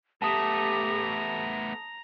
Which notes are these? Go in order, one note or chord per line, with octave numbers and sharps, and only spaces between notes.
A3 B3 G4 A5 A#5 D#6